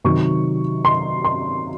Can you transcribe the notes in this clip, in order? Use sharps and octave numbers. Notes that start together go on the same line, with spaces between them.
C3 D#3 F#3 C#6
C6
C6